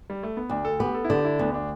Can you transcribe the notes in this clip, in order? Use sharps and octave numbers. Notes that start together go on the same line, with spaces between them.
G3
A3
B3
D2 D4
A4
B3 G4
A4
E4
D3 G4
E4
D2 B3
D4